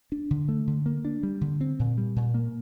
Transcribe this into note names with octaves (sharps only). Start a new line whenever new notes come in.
D4
D3
A3
D3
A#3
D4
G3
D3
C4
A#2
G3
A#2
A#3